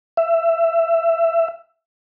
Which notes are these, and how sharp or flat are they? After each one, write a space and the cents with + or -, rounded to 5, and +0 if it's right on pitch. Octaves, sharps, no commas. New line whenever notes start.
E5 +20